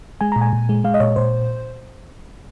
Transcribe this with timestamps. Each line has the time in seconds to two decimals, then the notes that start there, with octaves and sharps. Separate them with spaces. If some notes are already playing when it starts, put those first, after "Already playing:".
0.21 G#3 G#5
0.32 A#5
0.36 A#2
0.41 G#5
0.53 A#2
0.69 G#3
0.84 G#3 F5
0.94 D#5
1.00 A#2 C#5
1.16 A#2 C5